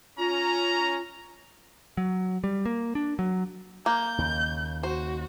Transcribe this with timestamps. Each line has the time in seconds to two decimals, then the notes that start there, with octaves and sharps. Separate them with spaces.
0.18 C#4 F4 A#5
1.97 F#3
2.44 G3
2.66 A#3
2.95 D4
3.19 F#3
3.86 A#3 G6
4.18 D#2 C#3
4.83 F#4 C5